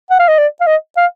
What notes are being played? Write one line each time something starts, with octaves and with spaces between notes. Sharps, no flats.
F#5
F5
D#5
D5
F5
D#5
F5